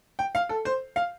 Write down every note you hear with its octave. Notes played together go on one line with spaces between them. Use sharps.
G5
F5
A4
C5
F5